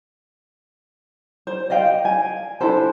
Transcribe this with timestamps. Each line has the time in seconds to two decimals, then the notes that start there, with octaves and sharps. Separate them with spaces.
1.47 C5
1.70 D5 D#5 F5 G5
2.05 G#5
2.61 D4 E4 A4 C5